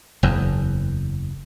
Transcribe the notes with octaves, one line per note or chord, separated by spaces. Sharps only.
F#1 E2